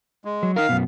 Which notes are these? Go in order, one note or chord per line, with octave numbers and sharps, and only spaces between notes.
G#3
F#3
D#4 A#4 F5
F#2 B2